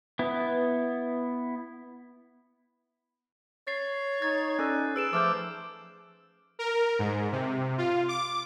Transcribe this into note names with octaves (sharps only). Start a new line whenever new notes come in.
B3 E4
C#5 A6 C7
D#4 G#6 A6
C#4 A4 D5 F#6
G#4 B4 E6 D7 E7
F3 A3 D6 E6 F6 G6
A#4
G#2
C3
F4
D6